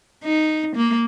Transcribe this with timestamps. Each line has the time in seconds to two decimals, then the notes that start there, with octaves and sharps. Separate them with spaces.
0.24 D#4
0.76 A#3